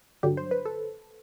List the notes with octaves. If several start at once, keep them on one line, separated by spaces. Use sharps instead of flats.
G2 D3 F#3 G4
C5
B4
A4